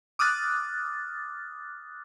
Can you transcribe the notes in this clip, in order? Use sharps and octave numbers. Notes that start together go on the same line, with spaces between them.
D6 D#6 F6 F#6 A6